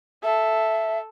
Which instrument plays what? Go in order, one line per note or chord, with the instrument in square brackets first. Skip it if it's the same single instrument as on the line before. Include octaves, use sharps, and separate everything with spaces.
[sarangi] A4 [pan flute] E5